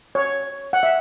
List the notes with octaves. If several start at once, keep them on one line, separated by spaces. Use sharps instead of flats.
C#5
F#5
E5